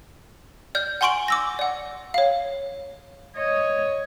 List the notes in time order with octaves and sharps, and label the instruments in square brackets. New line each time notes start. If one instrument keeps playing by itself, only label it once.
[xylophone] D5 F6 G6
F#5 G#5 C6 C#6 D7 F#7
D6 E6 A#6
D5 F#5
C#5 F5
[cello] C#5 D#5